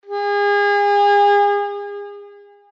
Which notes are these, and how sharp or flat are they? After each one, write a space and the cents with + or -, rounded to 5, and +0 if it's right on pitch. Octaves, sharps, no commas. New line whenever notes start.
G#4 -35